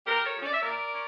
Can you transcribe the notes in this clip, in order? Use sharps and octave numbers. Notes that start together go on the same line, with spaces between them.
A#2 G4 A#4
A4 C#5
F3 C#4
D5
E5
A#2 A#4 D5
C#4